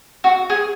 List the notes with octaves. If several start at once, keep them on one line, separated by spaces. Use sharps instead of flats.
F#4
G#4